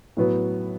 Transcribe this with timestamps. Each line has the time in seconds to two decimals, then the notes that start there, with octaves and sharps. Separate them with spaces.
0.17 A2 F#3 B3